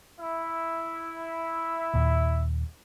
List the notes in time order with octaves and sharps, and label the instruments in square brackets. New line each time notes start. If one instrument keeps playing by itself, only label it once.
[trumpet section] E4 E5
[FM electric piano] D#2 A#2